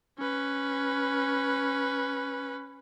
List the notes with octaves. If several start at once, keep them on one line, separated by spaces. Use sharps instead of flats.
C#4 B4